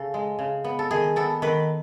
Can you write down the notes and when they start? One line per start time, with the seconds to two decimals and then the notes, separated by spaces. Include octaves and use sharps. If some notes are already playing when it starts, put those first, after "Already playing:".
Already playing: C#3 A4
0.14 G#3
0.39 C#3
0.64 B3
0.79 A4
0.91 D#3 G#4
1.16 B3 A4
1.42 D#3 B4